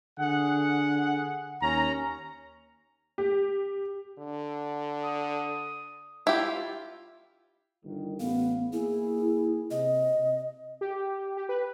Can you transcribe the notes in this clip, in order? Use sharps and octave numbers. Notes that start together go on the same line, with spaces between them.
D3 G#4 F#5
D#2 C#4 A#5
G4
D3
D#6
E4 F4 G4
G1 D#3
A1 B3 F5
A#3 E4 G#4
C3 D#5
G4
G4
B4